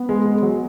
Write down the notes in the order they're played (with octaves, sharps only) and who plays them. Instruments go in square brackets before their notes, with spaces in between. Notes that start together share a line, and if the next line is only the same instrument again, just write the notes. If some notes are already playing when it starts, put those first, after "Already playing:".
Already playing: [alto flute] B3
[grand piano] G#3
G#3
F#3